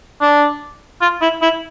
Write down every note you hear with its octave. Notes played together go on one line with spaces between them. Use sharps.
D4
F4
E4
E4